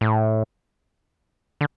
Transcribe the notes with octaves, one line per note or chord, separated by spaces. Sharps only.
A2
D3